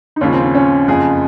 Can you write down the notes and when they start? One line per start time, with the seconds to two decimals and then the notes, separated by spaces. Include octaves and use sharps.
0.16 D#4
0.21 D#2 C#3 F3 C#4
0.32 C4
0.43 C4
0.55 C#4
0.87 F#1 F2 C#3 F3 G#4